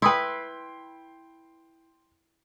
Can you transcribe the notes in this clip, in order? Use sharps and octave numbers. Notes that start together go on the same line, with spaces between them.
E4 B4 G5 B5 C6 D#6